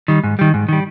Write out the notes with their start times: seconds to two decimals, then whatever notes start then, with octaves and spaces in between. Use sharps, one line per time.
0.08 D#3 G3
0.24 G#2
0.39 D#3 G3
0.54 G#2
0.69 D#3 G3